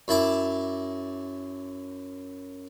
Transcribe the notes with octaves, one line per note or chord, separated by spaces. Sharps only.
F#2 E4 A5 D6